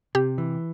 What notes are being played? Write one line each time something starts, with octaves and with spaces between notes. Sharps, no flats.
C3 G4
E3